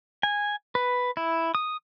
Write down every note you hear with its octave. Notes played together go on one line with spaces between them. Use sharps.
G#5
B4
E4
D#6